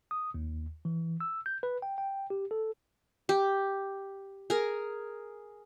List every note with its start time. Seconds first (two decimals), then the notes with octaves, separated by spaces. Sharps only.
0.11 D#6
0.34 D#2
0.85 E3
1.20 E6
1.46 G6
1.63 B4
1.82 G5
1.98 G5
2.30 G4
2.51 A4
3.29 G4
4.50 G#4 A#4